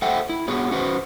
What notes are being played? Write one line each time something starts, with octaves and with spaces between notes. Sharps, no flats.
A4 C5 E5 F#5 G5
E4
B3 F#4 G#4 C#5
C#4 F#4 B4 C5 D5